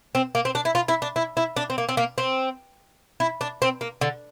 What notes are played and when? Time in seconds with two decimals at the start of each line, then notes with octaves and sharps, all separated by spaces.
0.15 C4
0.35 A#3
0.45 C4
0.55 D4
0.65 E4
0.75 F4
0.88 E4
1.02 D4
1.16 E4
1.37 E4
1.56 D4
1.70 C4
1.78 A#3
1.89 C4
1.97 A#3
2.18 C4
3.20 E4
3.41 D4
3.62 C4
3.81 A#3
4.01 D3